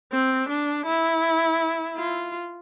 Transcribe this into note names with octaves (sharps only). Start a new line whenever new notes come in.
C4
D4
E4
F4